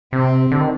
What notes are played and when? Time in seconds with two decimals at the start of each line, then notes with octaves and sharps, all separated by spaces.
0.13 C3 C4
0.51 D3
0.60 D#3